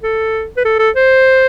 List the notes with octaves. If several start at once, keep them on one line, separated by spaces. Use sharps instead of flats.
A4
B4
A4
A4
C5